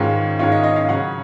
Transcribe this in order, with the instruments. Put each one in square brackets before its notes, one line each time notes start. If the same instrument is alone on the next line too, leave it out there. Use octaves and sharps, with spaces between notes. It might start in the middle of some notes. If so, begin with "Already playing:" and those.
Already playing: [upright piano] G#2 D#3 G#3 C#4 F4
G#2 D#3 G#3 C#4 F4
D#5
D#5
F5
C#3 F#3 C#4 F#5